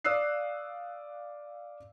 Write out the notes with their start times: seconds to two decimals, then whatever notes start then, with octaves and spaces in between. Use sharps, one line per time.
0.05 D5 F5 D#6 E6 F#6 C7